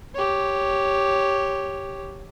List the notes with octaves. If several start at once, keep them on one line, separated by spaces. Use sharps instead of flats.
G4 C#5